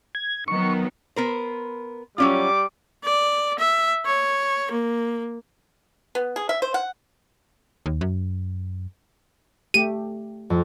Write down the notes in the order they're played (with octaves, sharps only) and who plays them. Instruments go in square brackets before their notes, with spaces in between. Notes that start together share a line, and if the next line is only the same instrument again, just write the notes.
[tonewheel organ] G#6
[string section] D#3 F#3 B3 [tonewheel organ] C#6
[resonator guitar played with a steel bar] B3 A#4 C5
[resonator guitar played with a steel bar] F#3 C#4 F4 [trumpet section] G3 D6
[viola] D5
E5
C#5
A#3
[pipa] B3
G#4
E5
C5
F#5
[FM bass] D#2
F#2
[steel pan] A3 G4 [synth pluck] D#7
[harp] F2